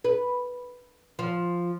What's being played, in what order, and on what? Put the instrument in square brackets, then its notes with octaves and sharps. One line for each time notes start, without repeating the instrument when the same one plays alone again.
[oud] B4
F3